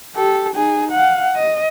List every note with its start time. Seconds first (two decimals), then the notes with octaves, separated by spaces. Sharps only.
0.15 G4 A4
0.53 D#4 G#4
0.92 F5 F#5
1.35 D#5